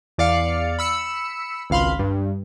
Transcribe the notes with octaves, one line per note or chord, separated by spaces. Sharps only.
E2 D5 F5 C#7
B5 E6 C#7
G#1 C#2 F5 B5 C6
G2